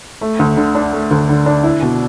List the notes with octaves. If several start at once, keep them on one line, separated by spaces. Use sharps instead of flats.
A3
D2
D3
D4
A3
D2
D3
D4
E4
B2